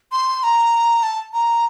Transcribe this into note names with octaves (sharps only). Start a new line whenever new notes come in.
C6
A#5
A5
A#5